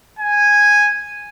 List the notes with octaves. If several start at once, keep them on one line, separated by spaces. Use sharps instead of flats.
G#5